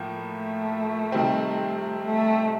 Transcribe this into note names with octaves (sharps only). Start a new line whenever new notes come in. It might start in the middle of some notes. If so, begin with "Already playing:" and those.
Already playing: A2 F3 A#3
A3
C3 D#3 G3 C4
A3